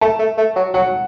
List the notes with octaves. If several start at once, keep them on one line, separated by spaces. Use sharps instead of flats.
A3 A5
A3
A3
F#3
F#3 F#5